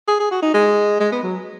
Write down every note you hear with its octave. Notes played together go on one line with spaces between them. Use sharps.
G#4
G#4
F#4
D#4
G#3
G#3
B3
F#3